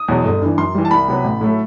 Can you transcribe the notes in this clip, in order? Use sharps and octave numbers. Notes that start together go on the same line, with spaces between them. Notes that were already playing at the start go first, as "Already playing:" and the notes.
Already playing: D#6
E2 B2 F#3
G1
G2 E3
F#2 C6
E3 G3
A5
C2 B5
C3 F#3 B3
A1
A2 F#3 A3